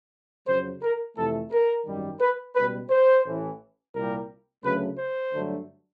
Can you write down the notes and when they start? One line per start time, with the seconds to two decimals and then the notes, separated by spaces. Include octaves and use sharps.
0.48 F2 C#3 F#3 C5
0.82 A#4
1.17 F2 C3 E3 A3 A4
1.52 A#4
1.86 G#1 F#2 D#3 G3
2.20 B4
2.55 C#2 B2 G3 B4
2.90 C5
3.25 A1 A2 E3
3.94 C2 A#2 G3 A#4
4.64 D2 C#3 F#3 A3 B4
4.98 C5
5.33 G2 D3 F#3 A3